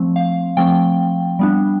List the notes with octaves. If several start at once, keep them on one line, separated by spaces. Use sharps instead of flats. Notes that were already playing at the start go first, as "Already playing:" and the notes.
Already playing: F3 A3 C4
F5
F3 A3 C4 G5
G3 B3 D4